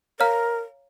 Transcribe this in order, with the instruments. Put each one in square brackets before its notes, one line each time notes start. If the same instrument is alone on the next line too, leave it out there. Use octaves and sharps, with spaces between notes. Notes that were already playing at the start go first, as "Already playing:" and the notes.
[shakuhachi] A#4 [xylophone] C#5 F5 A#5 F6